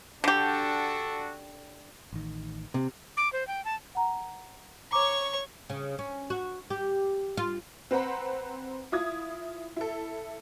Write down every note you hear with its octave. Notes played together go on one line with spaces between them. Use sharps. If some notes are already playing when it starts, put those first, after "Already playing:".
D3 D4 F#4 G4 A4
A1 D#3
C3
D6
C5
G5
A5
F#5 A#5
C#5 A#5 C#6 D6
C#3
C#4
F#4
G4
F4
C4 B4 C5 F#5 A#5 B5
E4 F4 D#6 G#6
E4 A4